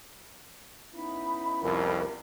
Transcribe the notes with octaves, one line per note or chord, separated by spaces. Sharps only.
B3 C#4 D#4 E4 B5
C2 F2 A#4